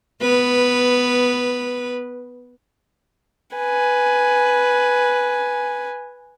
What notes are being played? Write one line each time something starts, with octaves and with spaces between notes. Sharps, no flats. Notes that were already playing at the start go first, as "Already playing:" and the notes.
B3 B4
B4 G#5